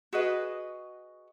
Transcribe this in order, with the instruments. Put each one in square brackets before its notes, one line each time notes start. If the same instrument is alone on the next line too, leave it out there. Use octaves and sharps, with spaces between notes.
[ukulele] F#4 G#4 B4 D#5